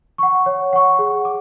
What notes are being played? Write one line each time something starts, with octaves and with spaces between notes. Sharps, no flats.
F#5 C#6
C#5
F#5 C#6
G#4
D6